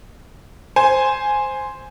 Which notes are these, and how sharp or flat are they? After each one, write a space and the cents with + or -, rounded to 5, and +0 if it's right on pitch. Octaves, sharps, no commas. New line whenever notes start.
C5 +0 G#5 +0